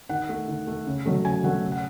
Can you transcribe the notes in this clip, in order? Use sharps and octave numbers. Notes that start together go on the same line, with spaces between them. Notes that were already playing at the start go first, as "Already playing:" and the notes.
D#3 F#5
A3
D#3
A3
C#3
F#3 A3
C#3 G#5
F#3 A3 F#5
C#3
F#5